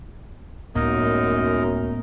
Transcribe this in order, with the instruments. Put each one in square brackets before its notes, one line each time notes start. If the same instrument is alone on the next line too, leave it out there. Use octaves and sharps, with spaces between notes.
[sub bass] C#2 [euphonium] F#2 [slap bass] A2 A#3 B3 [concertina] D#4 A#4 D#5